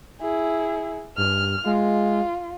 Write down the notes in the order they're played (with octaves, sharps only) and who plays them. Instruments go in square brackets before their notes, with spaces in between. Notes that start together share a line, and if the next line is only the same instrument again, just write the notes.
[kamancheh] E4 G#4
[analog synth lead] G2 [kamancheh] F6
[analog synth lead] G#3 [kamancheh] F4